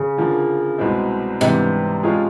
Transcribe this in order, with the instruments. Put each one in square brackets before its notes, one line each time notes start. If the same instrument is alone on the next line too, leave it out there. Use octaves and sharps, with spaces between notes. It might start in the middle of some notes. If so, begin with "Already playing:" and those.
Already playing: [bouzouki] C#3
[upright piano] D3 F3 A#3
C2 B2 G#3 C4 E4
[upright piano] G#2 E3 G3 B3 D4 [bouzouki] C3
[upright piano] F3 G#3 C#4 F4 G#4